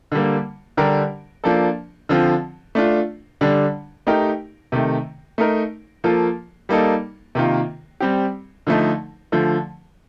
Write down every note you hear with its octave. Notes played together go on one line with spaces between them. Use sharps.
D3 G3 A#3
D3 G3 D4 G4 A#4
F3 A#3 D4 A4
D3 F3 C4 F4
A3 D4 F4
D3 G3 D4
A3 D#4 G4 A#4
C3 D#3 A3
A3 D#4 A#4
F3 A#3 F4 A4
G3 A#3 D#4 A4
C3 D#3 A#3 F4
G3 C4 G4
D3 F3 A3 D#4
D3 F3 A3